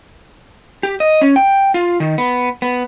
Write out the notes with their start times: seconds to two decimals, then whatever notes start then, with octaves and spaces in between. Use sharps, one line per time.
0.83 G4
1.00 D#5
1.21 C#4
1.36 G5
1.74 F4
2.00 D#3
2.18 B3
2.62 B3